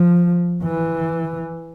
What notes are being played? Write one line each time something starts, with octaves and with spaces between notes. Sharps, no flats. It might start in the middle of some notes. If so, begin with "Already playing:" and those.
Already playing: F3
E3